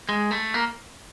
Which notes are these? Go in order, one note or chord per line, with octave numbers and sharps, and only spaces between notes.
G#3
A3
A#3